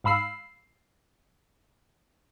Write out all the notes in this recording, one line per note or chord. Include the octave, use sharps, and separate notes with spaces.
G#2 F5 B5 E6 C7